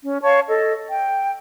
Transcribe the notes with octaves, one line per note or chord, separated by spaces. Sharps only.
C#4
C#5 F5 A5 C#6
A4 D#5
G5